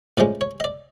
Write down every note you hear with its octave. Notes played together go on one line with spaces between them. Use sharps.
A2 F3 G#3 C#4 D5
C#5
D#5
D5